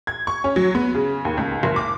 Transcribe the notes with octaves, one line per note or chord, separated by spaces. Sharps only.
G#6
C#6
C#4
F#3
B3
C#3
D#2
C#2
F#1
D6